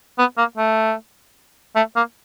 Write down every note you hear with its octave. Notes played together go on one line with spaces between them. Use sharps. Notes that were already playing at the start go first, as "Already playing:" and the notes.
B3
A#3
A3
A3
A#3